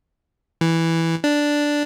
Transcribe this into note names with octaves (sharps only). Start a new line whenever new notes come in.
E3
D4